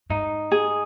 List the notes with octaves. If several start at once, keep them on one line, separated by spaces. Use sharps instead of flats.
G#2 D#4
G#4